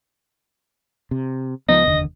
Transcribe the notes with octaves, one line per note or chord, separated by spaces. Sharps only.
C3
C#2 F3 B3 D#5
F1 D#2 D3